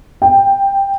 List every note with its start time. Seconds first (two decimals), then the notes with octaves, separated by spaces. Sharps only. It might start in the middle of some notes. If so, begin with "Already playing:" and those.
0.22 G5